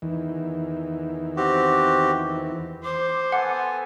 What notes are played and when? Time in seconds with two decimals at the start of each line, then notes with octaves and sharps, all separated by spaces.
0.02 E2 D#3 E3
1.37 C4 F#4 G4
2.84 C5 D6
3.32 B3 A4 F#5 G#5